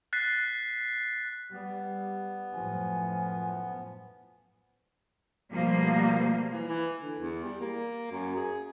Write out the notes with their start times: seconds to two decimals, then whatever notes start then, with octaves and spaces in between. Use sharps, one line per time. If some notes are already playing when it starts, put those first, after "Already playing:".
0.13 F#6 A6 B6 C7
1.53 G3 B3
2.52 F#2 A2 F3 G#5
5.52 B2 F3 G3 A3 A#3
6.52 E3
6.68 E3
6.99 D3
7.19 E2
7.44 G3
7.61 A#3
8.11 F#2
8.36 G#4